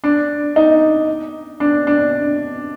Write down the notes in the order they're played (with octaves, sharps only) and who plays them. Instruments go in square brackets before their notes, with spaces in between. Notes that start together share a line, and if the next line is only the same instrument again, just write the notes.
[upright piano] D4
D#4
D4
D4